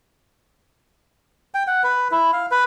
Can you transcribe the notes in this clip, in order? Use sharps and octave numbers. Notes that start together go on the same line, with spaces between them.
G5
F#5
B4
E4
F5
B4